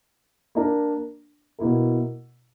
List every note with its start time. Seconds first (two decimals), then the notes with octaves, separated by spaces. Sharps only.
0.55 A#3 D4 A#4
1.59 B2 A#3 E4 A#4